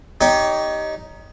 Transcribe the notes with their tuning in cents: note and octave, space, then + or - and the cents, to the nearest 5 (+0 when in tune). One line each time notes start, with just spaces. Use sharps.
D#4 +0 G4 +0 C#5 +30